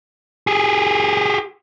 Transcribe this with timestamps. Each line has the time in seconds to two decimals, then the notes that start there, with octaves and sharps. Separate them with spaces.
0.47 G4 G#4